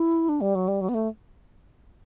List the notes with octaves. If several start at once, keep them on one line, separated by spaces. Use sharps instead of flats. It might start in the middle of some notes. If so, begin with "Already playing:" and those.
Already playing: E4
D4
G3
F#3
G3
F#3
B3
A3